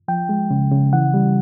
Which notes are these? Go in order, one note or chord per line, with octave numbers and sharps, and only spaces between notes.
F3 G5
G#3
C#3
C#3
E3 F#5
G3